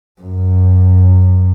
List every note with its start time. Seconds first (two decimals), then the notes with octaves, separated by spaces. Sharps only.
0.22 F#2